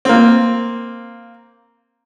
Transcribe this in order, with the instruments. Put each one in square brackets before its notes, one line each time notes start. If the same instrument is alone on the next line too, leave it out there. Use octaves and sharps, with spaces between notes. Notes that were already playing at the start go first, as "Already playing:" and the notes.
[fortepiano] A#3 C4